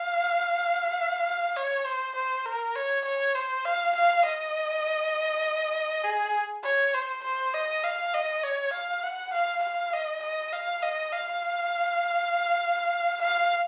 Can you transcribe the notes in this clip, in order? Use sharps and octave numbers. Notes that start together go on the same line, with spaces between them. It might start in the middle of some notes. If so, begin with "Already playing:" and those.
Already playing: F5
C#5
C5
C5
A#4
C#5
C#5
C5
F5
F5
D#5
G#4
C#5
C5
C5
D#5
F5
D#5
C#5
F5
F#5
F5
F5
D#5
D#5
F5
D#5
F5
F5